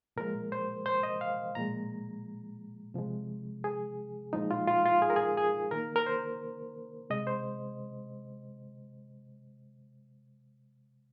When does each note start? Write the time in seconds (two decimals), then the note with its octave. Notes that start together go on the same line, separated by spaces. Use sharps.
0.16 A#2 F3 G#3 A#4
0.52 C5
0.86 C5
1.03 D#5
1.21 F5
1.55 A#2 F3 G#3 A#5
2.94 C3 F3 G#3
3.64 G#4
4.33 A#2 F3 G#3 D#4
4.51 F4
4.68 F4
4.86 F4
5.02 G#4
5.10 A#4
5.16 G#4
5.37 G#4
5.71 D#3 A#3 A#4
5.96 A#4
6.06 C5
7.10 C3 G#3 D#5
7.27 C5